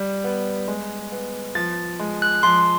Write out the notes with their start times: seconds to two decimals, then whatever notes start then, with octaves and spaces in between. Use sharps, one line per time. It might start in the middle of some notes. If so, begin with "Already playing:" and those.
Already playing: G3
0.24 B3
0.68 G#3
1.12 B3
1.55 F3 A6
2.00 G#3
2.22 F#6
2.43 F3 C6